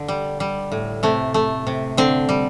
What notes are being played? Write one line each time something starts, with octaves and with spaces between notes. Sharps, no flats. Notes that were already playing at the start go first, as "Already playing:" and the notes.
Already playing: D3
G3
G3
A2
C3 A3
A3
C3
D3 C4
G3